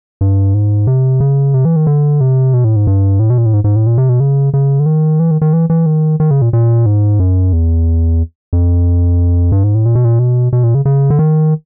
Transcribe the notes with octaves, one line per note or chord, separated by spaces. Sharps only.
G2
G#2
C3
C#3
C3
E3
D#3
D3
C3
B2
A2
G#2
G2
A2
B2
A#2
A2
G#2
G#2
A2
A#2
C3
B2
C#3
C#3
D3
D#3
E3
D#3
D#3
E3
E3
D#3
D#3
C#3
A#2
A#2
G#2
F#2
E2
F2
G2
G#2
A2
A#2
B2
A#2
B2
B2
A#2
C#3
C#3
D3
D#3